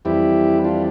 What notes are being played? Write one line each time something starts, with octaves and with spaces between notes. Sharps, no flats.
F2 E3 G3 E4 G4
D4 F4